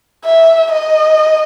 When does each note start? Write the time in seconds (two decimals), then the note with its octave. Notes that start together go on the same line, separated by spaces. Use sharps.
0.24 E5
0.72 D#5